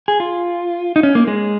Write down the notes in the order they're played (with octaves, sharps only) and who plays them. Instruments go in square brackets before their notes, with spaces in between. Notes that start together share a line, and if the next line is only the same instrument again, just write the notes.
[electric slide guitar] G#4
F4
D#4
C#4
A#3
G#3